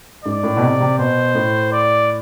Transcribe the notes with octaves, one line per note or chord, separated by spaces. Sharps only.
G#2 D5
A2
B2
C3
C3
B2 C5
A2
D5